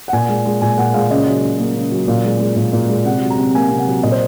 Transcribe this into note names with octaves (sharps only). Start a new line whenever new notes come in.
F#5
A#2 G#5
G#3
G#3
A#2 G#5
A#2 F#5
G#3 F5
C#3 D#5
F#3
C#3
A#3
C#3
F#3
A#2 F5
G#3
G#3
A#2
A#2
G#3
C3 F#5
F#3
A#5
C3
A#3 G#5
C3
F#5
F#3
A#2 D#5
C5